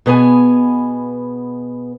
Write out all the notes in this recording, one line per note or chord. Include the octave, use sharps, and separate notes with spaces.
B2 B3 G#4 G#5